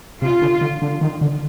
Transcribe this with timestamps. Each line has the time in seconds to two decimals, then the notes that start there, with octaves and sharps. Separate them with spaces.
0.22 C3 F4
0.42 D3
0.61 D3
0.82 D3
1.01 D#3
1.21 D3